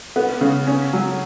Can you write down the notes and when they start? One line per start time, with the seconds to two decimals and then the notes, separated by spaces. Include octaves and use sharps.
0.16 B3
0.41 C#3
0.67 C#4
0.93 F#3